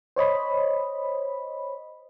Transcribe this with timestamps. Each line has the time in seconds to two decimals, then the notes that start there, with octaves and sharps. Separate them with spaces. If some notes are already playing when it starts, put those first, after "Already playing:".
0.16 C5 C#5 D#5 B5